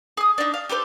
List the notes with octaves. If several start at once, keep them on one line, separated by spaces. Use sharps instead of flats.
G#4 D#6
D4 D#4
F5
G4 A4 B4 C5